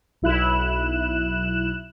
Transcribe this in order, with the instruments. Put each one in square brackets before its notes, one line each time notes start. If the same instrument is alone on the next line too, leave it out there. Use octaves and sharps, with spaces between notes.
[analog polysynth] B1 E4 F#6 E7